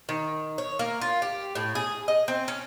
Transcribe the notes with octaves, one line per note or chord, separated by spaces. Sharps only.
D#3
C#5
A#3
F4
G4
A2
G#4
D#5
C4
C#4